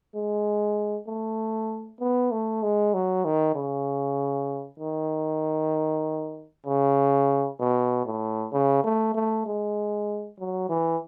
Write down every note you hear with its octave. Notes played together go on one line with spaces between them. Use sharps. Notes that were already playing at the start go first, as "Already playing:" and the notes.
G#3
A3
B3
A3
G#3
F#3
D#3
C#3
D#3
C#3
B2
A2
C#3
A3
A3
G#3
F#3
E3